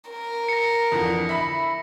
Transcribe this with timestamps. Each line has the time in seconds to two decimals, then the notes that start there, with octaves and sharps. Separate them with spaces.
0.11 A#4
0.49 A#6 C#7
0.92 F2 D3 E3
1.29 E5 B5